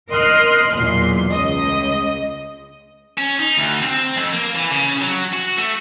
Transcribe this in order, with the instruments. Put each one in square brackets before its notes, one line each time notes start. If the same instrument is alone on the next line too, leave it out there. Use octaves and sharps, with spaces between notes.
[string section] A#4 D#5 C6 F6 F#6
B1 E2 A#2 C6
C#2 D#5
[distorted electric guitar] C#4
D#4
D2
C4
F2
A#3
E3
C#3
F#3
F#4
A3